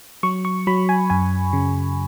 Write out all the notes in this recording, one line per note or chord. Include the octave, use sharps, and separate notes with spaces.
F#3 C#6
C#6
F#3 B5
G#5
F#2 G#5
C#3